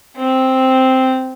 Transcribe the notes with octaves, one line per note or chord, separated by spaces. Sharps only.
C4